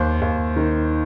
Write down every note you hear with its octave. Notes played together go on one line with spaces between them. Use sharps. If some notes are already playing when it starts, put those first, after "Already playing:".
Already playing: D#2 C5
D#2
D#3